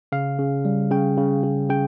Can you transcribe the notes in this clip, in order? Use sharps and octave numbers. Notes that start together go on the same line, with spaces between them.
C#3 F5
C#3
G3
C#3 G5
C#3
C#3
C#3 G5